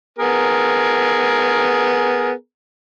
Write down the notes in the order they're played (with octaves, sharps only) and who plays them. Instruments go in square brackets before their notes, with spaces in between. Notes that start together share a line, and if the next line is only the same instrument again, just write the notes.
[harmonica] B3 G#4 A#4